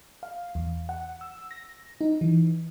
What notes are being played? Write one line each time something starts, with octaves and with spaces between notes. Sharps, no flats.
F5
E2
F#5
E6
A#6
D#4
E3